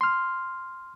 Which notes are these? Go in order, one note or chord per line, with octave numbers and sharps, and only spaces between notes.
C6 F6